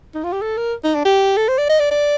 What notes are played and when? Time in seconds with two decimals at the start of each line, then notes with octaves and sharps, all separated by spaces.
0.14 D#4
0.24 F4
0.32 G4
0.41 A4
0.57 A#4
0.84 D#4
0.95 D4
1.05 G4
1.37 A4
1.48 C5
1.58 D5
1.69 D#5
1.80 D5
1.91 D5